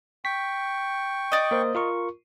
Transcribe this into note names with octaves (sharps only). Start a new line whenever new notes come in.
G5 C#6 B6
D5 D#5
A#3 A#4 C5
F4 A#4 C#6